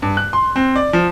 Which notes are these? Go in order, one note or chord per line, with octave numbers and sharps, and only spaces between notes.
G2
F#6
C6
C4
D5
F3